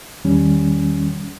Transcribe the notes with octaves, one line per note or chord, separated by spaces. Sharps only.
E2 D#3 G3 C#4